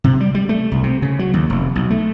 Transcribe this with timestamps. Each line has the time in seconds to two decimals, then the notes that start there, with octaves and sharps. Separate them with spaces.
0.04 C3
0.20 G3
0.34 G3
0.49 A3
0.72 C2
0.83 C3
1.02 C#3
1.19 F#3
1.34 D#2
1.50 F1
1.75 B1
1.90 A3